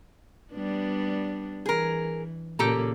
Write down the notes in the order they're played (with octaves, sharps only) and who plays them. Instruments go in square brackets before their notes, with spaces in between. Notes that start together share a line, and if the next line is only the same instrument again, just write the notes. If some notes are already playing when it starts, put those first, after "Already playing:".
[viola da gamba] G3 B3 D4
[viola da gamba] E3 [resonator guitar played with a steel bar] G#4 A#4
[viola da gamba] A#2 C#3 A#3 [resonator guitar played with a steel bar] G4 A4 A#5